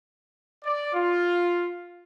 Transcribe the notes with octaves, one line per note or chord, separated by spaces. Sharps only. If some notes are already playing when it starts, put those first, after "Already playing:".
D5
F4